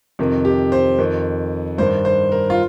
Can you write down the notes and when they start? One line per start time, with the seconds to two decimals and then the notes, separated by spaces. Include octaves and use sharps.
0.19 F2 C3 D#3
0.45 G4
0.72 C5
0.99 F2 D#3
1.78 G2 D#3 C5
2.05 C5
2.32 A#4
2.50 F4